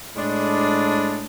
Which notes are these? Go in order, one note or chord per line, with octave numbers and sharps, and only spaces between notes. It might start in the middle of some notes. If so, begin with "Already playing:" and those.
A2 G#3 D4